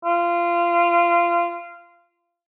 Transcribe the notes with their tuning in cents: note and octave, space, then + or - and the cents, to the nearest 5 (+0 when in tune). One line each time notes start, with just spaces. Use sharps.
F4 -20